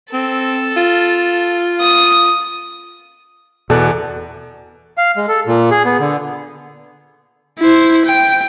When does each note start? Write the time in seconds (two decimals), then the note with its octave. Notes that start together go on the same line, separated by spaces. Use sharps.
0.13 C4 A4
0.77 F4
1.80 D#6
3.70 E2 B2 A4 D5 F#6
4.98 F5
5.17 G#3
5.28 A4
5.47 A#2
5.71 G#4
5.85 B3
6.00 D3
7.60 E4 C5
8.05 G5